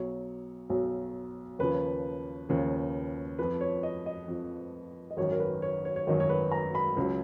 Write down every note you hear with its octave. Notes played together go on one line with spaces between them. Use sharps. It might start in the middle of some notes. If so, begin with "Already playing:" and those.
Already playing: B1 B2 F#3 C#5
B1 B2 F#3
D#2 C#3 F3 B4
D#2 C#3 F3
F2 F3 B4
C#5
D#5
D#5
F2 F3
D#5
G#1 F#2 D#3 F#3 C#5
A#4
B4
C#5
C#5
C#5
G#1 F#2 D#3 F#3 D#5
C#5
B4
A#5
B5
C#2 C#3 F#3